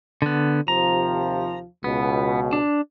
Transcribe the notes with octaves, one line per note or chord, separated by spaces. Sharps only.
D3 B3
D#2 C3 F3 A#5
C#2 B2 B3
D4